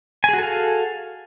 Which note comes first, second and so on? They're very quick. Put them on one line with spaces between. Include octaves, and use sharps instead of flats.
G#5 G#4 F#4 A4 F5